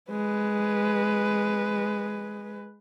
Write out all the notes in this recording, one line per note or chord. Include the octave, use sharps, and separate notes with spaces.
G#3 B4